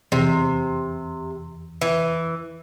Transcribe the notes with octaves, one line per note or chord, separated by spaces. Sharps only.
E2 C3
E3